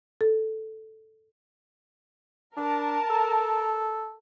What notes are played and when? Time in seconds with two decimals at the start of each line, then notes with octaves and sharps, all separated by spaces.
0.21 A4
2.57 D4 A#4 A5
3.10 A4